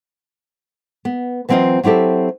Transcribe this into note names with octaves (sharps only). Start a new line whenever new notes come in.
B3
E3 F#3 C4 E4 F4 D#5
F#3 C4 E4 G4 A4